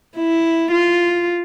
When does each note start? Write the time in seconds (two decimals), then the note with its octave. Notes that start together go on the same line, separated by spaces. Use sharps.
0.17 E4
0.72 F4